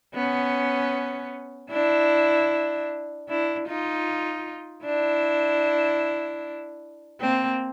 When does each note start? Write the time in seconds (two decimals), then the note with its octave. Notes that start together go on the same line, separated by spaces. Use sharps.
0.15 B3 C#4
1.71 D4 E4
3.29 D4 E4
3.68 D#4 F4
4.85 D4 E4
7.21 A#3 C4